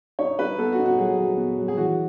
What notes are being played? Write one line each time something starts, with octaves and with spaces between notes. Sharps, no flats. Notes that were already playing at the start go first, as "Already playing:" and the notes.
D#4 C#5
D#4 B4
B3 A4
F#4
D#4
F#4
F#3 G#4
F#3
B3
F#3
G#4
E3 F#4